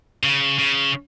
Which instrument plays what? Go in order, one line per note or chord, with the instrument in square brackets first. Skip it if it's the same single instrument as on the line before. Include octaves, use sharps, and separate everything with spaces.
[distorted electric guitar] C#3
C#3